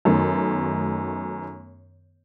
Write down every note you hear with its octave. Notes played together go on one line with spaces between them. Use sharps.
F#2 D#3 A3 B3